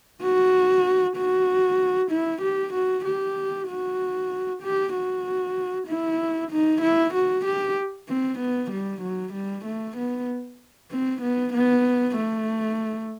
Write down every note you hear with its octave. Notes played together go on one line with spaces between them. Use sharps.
F#4
F#4
E4
G4
F#4
G4
F#4
G4
F#4
E4
D#4
E4
F#4
G4
C4
B3
G3
F#3
G3
A3
B3
C4
B3
B3
A3